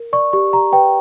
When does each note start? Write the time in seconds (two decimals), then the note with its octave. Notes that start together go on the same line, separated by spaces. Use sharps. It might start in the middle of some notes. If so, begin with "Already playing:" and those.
Already playing: A#4
0.13 D5 C#6
0.33 G4 C#6
0.53 G4 A#5
0.72 B4 G5